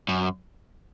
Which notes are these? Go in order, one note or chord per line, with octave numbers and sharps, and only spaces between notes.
F#2